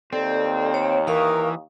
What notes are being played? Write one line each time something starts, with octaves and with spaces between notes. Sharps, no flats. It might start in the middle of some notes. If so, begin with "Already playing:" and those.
D#2 C4 A4 D5
C#5 F5
E3 A#4 F5 A#5 C#6 D#6